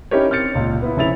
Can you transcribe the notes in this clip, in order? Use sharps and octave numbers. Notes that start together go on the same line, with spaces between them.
C#4 D#4 E4 G4 A#4 C#5
C4 F6 G6 A6 C#7
C#2 A#2
B3 E4
F1 C#3 E4 A6 F7